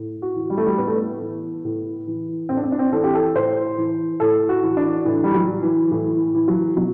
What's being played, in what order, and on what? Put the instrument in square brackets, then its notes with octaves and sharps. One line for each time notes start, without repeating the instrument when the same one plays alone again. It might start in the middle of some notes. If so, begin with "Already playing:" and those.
Already playing: [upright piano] A2
F#4
E3
G3
A3
G3
A2 B3
A3
B3
E3
A2
E3
A2 C4
D4
C4
D4
C4
E3 A4
G4
A4
A2 C5
E3
A2 A4
F#4
E3
D4
A2 E3
G3
F#3
E3
E3
A2 E3
E3
F#3
B2 F#3